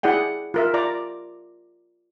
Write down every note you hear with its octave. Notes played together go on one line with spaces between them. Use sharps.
E4 G#4 D5 F#5 G5
F4 A#4 E5
F4 D5 A#5 D6